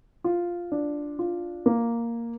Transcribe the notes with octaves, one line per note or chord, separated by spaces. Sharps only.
F4
D4
F4
A#3